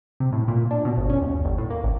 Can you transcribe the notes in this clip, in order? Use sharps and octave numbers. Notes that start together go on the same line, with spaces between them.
C3
A2
A#2
D4
B2
G1
C#4
D#2
G1
A2
A#3
A1